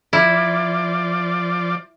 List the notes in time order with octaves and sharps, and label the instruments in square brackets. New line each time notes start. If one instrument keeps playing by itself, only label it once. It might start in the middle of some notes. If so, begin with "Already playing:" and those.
[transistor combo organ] F3 D5 [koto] E4